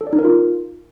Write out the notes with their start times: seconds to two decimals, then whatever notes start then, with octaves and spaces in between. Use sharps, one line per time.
0.01 A4
0.07 D5
0.13 D#4
0.19 A#4
0.25 F4